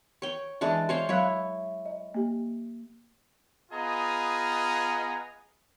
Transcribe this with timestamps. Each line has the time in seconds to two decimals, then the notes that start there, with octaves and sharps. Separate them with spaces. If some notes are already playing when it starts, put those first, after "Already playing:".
0.22 C#5 G5
0.61 E3 G#3 D4
0.89 C5 C#5 F5
1.09 F#3 E4 C#5 F5 F#6
1.86 D#5
2.15 A#3 G4
3.72 B3 F4 G#4 D#5 A#5